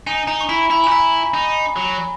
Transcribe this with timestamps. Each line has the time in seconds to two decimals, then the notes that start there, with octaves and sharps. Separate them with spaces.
0.07 D#4 G#5
0.27 D#4 A#5
0.41 C#6
0.49 E4 B5
0.70 E4 B5
0.84 G#5
0.86 F#4
0.91 E4 A#5
1.34 D#4
1.76 F#3